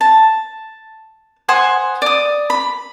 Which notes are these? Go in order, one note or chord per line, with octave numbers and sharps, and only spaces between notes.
A5
C5 F#5 G#5 D#6
D5 D#6
B5